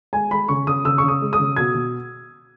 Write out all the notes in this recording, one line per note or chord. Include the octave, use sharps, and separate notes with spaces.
G#3 G#5
G#3 B5
C#3 C#6
C#3 D#6
C#3 E6
C#6
C#3
D#6
G#3
D#6
C#3
B2 G#6
B2